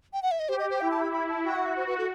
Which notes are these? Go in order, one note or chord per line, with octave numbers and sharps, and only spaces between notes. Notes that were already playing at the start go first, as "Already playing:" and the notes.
G5
F#5
E5
D#5
G4 C5
D#5
C5
E4 G5
A5
B5
B5
A5
F#4 G5
F#5
E5
C5
B4
A4